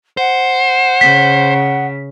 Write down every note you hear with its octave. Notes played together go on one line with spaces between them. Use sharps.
C5 F#5
C#3 B6